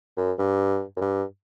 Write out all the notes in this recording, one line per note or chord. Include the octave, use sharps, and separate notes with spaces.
F#2
G2
F#2
G2